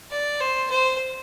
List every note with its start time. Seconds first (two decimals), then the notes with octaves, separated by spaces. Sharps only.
0.11 D5
0.40 C5
0.70 C5